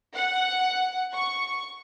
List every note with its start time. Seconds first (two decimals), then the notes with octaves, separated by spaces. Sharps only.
0.15 F#5
1.12 C#6